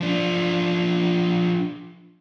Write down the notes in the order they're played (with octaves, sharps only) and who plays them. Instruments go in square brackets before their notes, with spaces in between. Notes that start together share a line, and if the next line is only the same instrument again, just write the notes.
[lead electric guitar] F3 D4